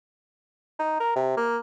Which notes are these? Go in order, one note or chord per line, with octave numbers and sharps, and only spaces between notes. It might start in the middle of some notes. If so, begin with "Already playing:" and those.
D#4
A#4
C3
A#3